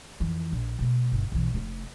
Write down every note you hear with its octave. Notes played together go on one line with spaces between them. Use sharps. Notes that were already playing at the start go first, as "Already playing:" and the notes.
F2 E3
A#1
B2 A3
G1
B1 E3
F1 A3